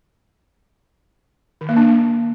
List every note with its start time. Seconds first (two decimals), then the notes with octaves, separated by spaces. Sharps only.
1.61 D#3
1.69 A#3
1.77 D4